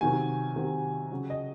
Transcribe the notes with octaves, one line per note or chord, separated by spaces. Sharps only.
C3 D#3 F#3 G#5
C3 D#3 F#3
C#3 F#3
D#5